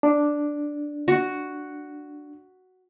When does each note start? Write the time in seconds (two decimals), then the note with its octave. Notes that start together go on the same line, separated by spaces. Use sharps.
0.03 D4
1.08 F#4